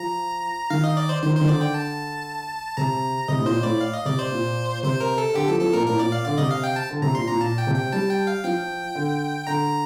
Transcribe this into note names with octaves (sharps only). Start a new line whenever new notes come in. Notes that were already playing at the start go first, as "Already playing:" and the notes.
Already playing: F3 A#5
D#3 F5
D#5
D5
C5
D#3 C5
C5
D#3
D3 D5
G5
A5
C3 A#5
C3 D#5
A2
A#2 C5
A2 D5
F5
D#5
C3 D5
C5
A#2
C3 C5
A#4
A4
D3 G4
F3 A4
F3 A4
A#2 A#4
A2 A#4
A#2 D5
F5
D3 D5
C3 D#5
F5
G5
A5
D3
C3 A#5
A#2 C6
A#2 A#5
A#2 A5
G5
C3
G5
G3 A5
G5
F5
F3 G5
D3
D3 A#5